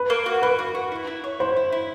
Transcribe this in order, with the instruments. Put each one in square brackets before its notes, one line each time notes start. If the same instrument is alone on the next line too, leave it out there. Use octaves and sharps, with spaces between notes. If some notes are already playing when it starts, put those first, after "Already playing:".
Already playing: [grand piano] B4
[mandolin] A#3
F#4
[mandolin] A#3 [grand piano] B4
[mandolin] F#4
F#4
E4
E4
C#5
[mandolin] E4 [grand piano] C5
[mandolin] E4
E4